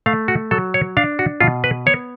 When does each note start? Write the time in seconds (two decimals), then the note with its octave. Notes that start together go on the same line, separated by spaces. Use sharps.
0.06 A3 F5
0.28 F#4
0.51 F#3 A4
0.74 C#5
0.97 D4 F5
1.19 F#4
1.40 B2 F4
1.64 B4
1.86 B3 C#5